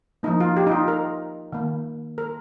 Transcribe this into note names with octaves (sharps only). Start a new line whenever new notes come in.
F3 A#3 D#4
F4
G4
D#4
F4
A#4
D#3 A#3
A#4